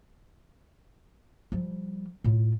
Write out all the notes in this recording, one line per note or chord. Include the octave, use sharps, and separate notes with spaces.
F3 G3
A2 F4